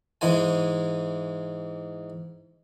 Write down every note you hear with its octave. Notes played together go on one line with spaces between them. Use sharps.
G#2 E3 G#3 G#5